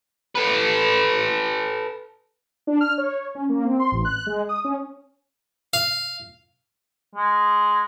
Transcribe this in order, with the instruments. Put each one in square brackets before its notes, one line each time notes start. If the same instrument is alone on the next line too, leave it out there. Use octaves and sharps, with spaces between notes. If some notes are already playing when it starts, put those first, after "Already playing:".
[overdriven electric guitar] A4 B4
[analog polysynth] D4
F6
C#5
C#4
A#3
C4
C6
A1
F#6
G#3
D#6
C#4
[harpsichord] F5
[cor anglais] G#3